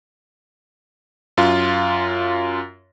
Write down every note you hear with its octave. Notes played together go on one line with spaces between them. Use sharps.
F#2 F4